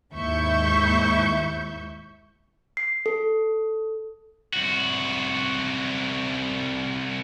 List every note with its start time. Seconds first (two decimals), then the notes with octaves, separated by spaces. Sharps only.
0.13 D#2 G#2 E4 E5 C#6 G6
2.77 C7
3.06 A4
4.53 C2 F#4